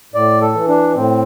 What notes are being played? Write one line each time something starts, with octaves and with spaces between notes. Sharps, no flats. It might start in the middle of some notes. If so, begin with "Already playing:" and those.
A2 D5
A4
E3
D4
A2 C4